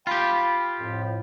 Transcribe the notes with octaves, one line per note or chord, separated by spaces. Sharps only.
F4 G4 G5 B5
F2 A2